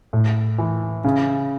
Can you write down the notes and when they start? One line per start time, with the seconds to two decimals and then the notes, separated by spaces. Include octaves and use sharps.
0.13 A2
0.58 E3
1.04 C#3